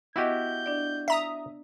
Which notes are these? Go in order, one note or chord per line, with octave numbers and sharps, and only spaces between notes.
B3 E4 F#4 G4 D#5 G6
D4 D5
E5 A#5 D#6